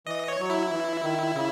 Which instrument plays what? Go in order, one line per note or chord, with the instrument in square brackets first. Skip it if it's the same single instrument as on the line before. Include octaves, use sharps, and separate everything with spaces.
[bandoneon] E3 [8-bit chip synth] D#5
[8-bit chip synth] C#5
[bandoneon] F#3
[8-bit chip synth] E4
[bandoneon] E3
D#3
C#3